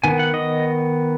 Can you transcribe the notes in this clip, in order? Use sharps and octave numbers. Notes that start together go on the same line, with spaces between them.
D#3 B3 G#5
F#5
D#5